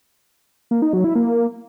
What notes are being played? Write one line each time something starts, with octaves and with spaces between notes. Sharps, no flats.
A#3
D#4
F#3
E4
A#3